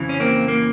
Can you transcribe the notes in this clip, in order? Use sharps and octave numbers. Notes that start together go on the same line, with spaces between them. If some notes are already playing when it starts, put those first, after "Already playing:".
Already playing: F2 C#3 E3
C#4
A#3 C4
A#3